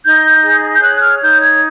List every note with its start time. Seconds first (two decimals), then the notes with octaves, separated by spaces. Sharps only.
0.04 D#4 G6
0.43 G#4
0.76 G6
0.82 C#5 F#6
1.02 F6
1.22 D#4 G6
1.42 G#6